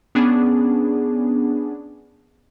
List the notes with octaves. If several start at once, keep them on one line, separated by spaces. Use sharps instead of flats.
B3 C#4 D4 G#4